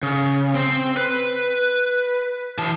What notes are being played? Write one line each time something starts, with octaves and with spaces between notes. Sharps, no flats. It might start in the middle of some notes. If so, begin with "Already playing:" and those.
C#3
C4 C5
B4
E3 A5